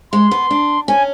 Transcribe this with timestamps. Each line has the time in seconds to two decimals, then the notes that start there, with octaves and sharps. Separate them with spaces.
0.12 G#3 C6
0.31 B3
0.51 D4
0.88 C#4 G#5